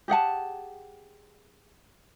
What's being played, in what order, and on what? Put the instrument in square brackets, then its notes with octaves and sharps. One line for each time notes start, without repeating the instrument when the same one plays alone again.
[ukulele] G4 G#4 F#5 A5